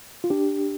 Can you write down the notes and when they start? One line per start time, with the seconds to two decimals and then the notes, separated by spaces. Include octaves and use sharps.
0.24 F4
0.30 D4 G4